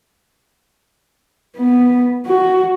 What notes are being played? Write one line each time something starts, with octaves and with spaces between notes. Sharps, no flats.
B3
F#4